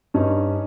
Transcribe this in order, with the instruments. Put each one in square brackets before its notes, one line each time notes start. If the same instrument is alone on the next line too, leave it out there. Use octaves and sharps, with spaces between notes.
[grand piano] G2 [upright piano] C#4 D#4